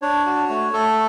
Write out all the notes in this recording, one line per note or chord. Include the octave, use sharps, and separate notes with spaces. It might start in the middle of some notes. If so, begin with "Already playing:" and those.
D4 C#5
F#4
A3
A3 A4